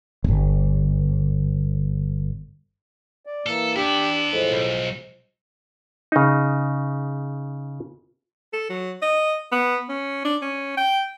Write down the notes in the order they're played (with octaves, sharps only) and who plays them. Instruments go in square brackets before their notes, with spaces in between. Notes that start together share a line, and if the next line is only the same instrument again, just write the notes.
[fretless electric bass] D1 G1
[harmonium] D5
[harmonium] E3 A#3 [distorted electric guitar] A4
[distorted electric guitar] B3 E4 [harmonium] D4 [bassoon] G4
[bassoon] A2 [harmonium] F3 G#3
[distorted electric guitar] B1
[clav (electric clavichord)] C#3 D#4
[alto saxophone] A4
F#3
D#5
B3
C#4
D4
C#4
G5